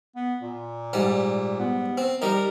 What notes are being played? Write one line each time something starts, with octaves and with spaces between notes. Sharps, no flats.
B3
A#2
G#2 G3
B3
C4
G3 D#4 A#4